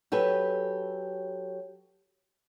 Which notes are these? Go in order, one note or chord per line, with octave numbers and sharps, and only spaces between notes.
F#3 G4 A4 B4 G#5